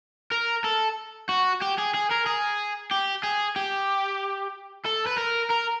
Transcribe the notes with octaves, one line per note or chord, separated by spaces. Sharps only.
A#4
A4
F#4
G4
G#4
G#4
A#4
G#4
G4
G#4
G4
A4
B4
A#4
A#4